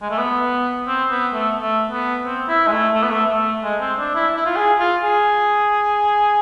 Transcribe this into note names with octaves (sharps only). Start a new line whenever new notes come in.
G#3
A3
B3
C4
B3
A3
A3
B3
C4
E4
G#3
A3
A3
B3
A3
A3
G#3
C4
D4
E4
E4
F4
G#4
F4
G#4